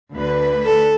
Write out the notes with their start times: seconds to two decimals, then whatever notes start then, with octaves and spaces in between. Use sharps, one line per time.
0.14 D2 D3 B4
0.65 A4